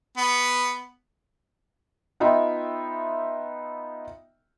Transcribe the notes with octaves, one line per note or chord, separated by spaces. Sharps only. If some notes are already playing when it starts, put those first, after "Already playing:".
B3
B3 D#4 F4 E5 G5